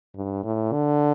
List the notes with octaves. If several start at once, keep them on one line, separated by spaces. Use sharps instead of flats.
G2
A2
D3